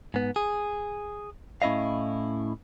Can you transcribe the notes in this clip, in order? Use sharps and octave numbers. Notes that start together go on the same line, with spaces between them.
G#2 B3
G#4
A2 C#4 E4 D#5 F5